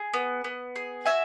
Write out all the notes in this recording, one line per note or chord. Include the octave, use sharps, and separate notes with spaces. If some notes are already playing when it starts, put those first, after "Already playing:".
Already playing: G#4
B3
B3
G#4
F#4 E5 G#5